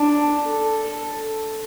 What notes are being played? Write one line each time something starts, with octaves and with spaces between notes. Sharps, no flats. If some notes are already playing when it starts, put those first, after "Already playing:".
Already playing: D4
A4